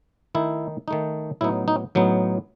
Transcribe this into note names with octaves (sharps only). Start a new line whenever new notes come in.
D#3 A3 D#4 E4
D#3 A3 D#4
A2 F#3 B3 D#4 E4
D#4
A2 F#3 B3 D#4